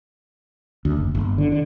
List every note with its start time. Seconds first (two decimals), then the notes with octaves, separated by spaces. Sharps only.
0.85 D2
0.97 F#1
1.15 G1
1.38 D3
1.52 D3